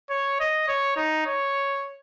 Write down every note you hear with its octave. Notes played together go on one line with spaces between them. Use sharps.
C#5
D#5
C#5
D#4
C#5